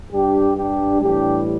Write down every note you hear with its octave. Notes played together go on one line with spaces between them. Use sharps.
G2 G3 D4 G4
D4 G4
A2 E3 G3 D4 G4